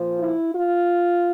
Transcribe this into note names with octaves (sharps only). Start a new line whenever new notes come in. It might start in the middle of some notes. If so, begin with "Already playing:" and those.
Already playing: A#2 F3
E4
F4